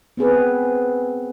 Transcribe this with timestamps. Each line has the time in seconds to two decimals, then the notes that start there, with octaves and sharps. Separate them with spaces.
0.17 B3 C4 G#4 B4